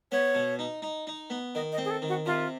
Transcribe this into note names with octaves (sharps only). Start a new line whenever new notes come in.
B3 C#5
B2
D#4
D#4
D#4
B3
D#3 D#5
D#5
C4
G#4
A4
D#3
F#4
C3 F4